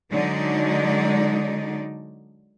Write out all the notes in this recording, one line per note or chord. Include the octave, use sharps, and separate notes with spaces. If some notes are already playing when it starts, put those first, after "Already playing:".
D3 F#3 G#3 D#4 D5